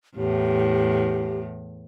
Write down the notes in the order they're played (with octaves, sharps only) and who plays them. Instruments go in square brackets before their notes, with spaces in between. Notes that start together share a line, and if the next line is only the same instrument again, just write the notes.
[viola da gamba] E2 A2 [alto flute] G4